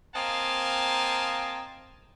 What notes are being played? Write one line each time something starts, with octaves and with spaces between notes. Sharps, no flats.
A#3 C4 D#5 F5 G#5 A5